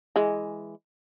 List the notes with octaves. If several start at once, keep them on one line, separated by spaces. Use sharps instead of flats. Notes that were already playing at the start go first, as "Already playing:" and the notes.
E3 G#3